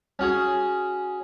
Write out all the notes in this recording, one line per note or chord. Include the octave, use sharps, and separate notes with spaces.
C#4 F#4 G#4